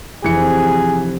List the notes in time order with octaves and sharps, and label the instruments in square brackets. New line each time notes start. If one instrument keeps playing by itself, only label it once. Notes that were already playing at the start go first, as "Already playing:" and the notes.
[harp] F1 [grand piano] E3 C#7 [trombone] G#4